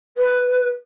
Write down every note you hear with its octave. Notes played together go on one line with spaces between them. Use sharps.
B4